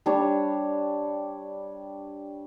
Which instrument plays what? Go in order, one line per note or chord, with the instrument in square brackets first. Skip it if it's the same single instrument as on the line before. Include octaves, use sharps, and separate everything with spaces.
[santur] G3 D4 C#5